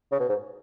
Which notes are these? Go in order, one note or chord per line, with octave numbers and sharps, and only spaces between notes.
C#3
B2
G#2